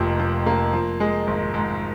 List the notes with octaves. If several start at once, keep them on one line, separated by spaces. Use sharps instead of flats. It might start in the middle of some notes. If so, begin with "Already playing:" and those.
Already playing: F1 F2 F3 A#3
F3
A#3
F3
G#3
G#1
G#2